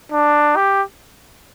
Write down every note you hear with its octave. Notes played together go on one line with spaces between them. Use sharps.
D4
G4